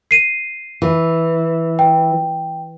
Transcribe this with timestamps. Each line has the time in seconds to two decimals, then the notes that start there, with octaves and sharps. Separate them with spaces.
0.11 C7 D#7
0.82 E3
1.79 G5